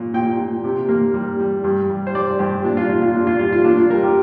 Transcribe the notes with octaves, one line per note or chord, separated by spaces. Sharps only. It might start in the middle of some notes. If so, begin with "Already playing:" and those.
Already playing: A#2
A#2 G5
A#2
C3
A#3
G3
G3
G2
G3
C5
G3 D5
G2 G4
A#2 D4
F4
A#2 F4
F4
A#2 D4
F4
G3 F4
F4
A#3 D4
F4
G3 A#4
G4